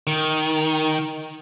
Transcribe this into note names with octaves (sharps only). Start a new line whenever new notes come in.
D#3